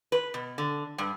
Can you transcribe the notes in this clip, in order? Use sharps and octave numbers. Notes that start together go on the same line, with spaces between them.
B4
B2
D3
G2